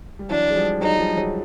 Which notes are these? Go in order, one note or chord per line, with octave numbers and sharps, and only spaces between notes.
G3
E3 F#3 D4
G#3
F3 G3
F#3 G#3 D#4
F3 G3
F#3 G#3